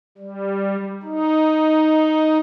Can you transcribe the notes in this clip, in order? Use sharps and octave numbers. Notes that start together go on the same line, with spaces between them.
G3
D#4